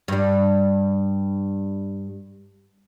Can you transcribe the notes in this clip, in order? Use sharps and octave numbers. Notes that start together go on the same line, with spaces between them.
G2 G3